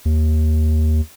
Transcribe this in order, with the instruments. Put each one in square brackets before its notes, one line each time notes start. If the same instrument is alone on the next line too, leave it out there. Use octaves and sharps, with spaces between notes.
[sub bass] D#2